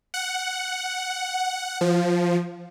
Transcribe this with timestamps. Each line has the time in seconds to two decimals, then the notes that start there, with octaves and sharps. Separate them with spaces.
0.14 F#5
1.81 F3